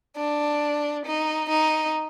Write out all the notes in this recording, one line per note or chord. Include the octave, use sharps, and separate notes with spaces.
D4
D#4
D#4